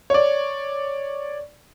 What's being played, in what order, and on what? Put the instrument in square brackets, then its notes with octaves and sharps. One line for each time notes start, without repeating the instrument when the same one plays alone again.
[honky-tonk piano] C#5 D5